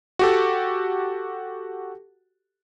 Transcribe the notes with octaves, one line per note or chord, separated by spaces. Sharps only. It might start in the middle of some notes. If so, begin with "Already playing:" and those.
F#4 G4 A4